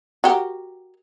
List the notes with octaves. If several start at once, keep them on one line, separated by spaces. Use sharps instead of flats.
F#4 G4 A#4